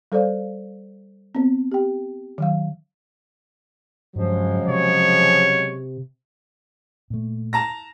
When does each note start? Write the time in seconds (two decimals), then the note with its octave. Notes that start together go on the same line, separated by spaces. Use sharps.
0.12 G3 A4 C5 D5 F5
1.35 B3 C4
1.72 G4 G5
2.38 D#3 F#3 F5
4.16 G2 C#3 F3 F#3 G#3
4.68 C3 C#5
7.10 A#2 A3
7.53 A5 A#5 A#6